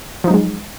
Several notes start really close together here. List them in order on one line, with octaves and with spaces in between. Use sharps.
F3 D#4 F#3 G#3